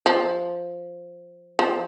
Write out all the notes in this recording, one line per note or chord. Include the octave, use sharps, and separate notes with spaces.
F3
F3